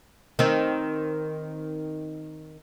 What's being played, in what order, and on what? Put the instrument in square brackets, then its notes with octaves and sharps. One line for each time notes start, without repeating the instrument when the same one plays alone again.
[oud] D#3 C4